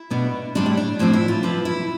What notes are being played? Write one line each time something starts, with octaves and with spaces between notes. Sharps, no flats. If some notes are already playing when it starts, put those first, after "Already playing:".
Already playing: E4
B2 B3 D4
A2 G3 C4 D4
E4
D4
A2 F3 C4 D4
E4
F4
C3 F3 C4 B4
E4